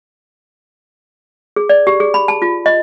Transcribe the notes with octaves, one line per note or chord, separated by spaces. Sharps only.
G#4
D5
G4
G#4
B5
A5
F4
D#5